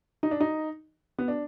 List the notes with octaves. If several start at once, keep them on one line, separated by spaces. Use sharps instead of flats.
D#4
D4
D#4
B3
D4